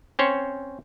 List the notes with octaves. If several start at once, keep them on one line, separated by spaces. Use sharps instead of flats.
C4 C#4 C5 C#5